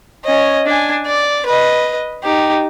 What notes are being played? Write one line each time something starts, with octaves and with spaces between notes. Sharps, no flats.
C#4 D#5
D4 G#5
D5
B4 D#5
D#4 G4